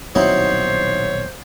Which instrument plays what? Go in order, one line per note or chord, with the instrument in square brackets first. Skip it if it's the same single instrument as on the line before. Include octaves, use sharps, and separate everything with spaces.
[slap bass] D#1 B1 C4 [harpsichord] F#3 D#4 E4 [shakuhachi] C5 [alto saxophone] C#5